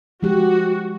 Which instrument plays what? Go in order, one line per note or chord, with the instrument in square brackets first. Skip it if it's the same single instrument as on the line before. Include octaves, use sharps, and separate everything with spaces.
[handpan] F3 G#3 G4 [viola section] F#4